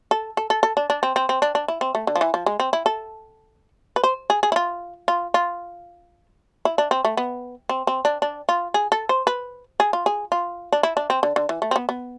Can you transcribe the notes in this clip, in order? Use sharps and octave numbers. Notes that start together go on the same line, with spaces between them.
A4
A4
A4
A4
D4
D4
C4
C4
C4
D4
D4
E4
C4
A3
D3
F3
E3
F3
G#3
C4
E4
A4
B4
C5
G#4
G#4
E4
F4
F4
F4
E4
D4
C4
A3
B3
C4
C4
D4
D4
F4
G#4
A4
C5
B4
G#4
F4
G#4
F4
D4
E4
D4
C4
D3
D3
E3
A3
C4
B3
B3